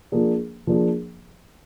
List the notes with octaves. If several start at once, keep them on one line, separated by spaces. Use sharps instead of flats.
F3 A#3 D4 G#4
F3 A#3 D4 G#4